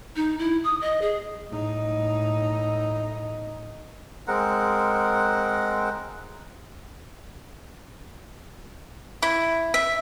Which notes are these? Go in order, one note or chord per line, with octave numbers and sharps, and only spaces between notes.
D#4
E4
D#6
D#5
G#4
A2 D#4
G#3 C4 A#4 F#5
E4
E5